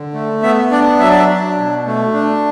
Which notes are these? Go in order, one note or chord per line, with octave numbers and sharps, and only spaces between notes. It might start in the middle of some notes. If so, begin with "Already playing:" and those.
Already playing: D3
A3
B3 E5
D4 D5
F#3 E5
D5
E5
D4
B2
A3
D4